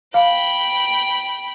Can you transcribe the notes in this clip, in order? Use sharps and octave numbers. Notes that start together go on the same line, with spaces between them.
F5 G5 B5